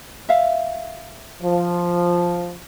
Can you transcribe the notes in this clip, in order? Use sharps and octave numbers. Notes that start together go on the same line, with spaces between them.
E5 F5
F3